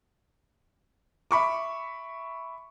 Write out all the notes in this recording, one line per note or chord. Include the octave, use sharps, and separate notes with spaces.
E5 B5 C#6 D6